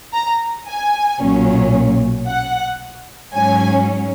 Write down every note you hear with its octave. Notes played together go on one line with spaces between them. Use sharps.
A#5
G#5
B1 A#2 F#3 C#4
F#5
G#2 F#3 C#4 G#5